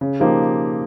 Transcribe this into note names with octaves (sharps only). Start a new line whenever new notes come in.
C#3
F3 A#3 D#4 G4